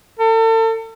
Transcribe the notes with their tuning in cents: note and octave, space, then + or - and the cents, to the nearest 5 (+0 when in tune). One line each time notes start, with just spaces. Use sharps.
A4 +35